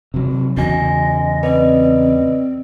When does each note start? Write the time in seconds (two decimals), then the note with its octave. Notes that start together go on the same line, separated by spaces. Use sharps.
0.14 C3 F#3
0.57 E2 C#3 F#4 D#5 G#5
1.43 C4 B4 D5 D#5